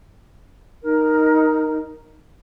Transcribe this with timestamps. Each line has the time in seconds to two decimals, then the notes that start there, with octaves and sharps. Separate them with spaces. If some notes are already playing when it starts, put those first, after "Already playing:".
0.82 D#4 A#4